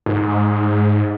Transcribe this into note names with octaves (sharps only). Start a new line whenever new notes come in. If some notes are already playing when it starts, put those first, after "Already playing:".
G#2
G#2